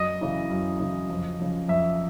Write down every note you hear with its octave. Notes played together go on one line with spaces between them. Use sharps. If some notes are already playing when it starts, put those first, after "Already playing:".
Already playing: F#2 D#5
C#3 E3
F#2
C#3 E3
F2
C#3 F3
F2 E5